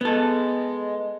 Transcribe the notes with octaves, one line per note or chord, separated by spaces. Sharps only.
G#3 B3 A4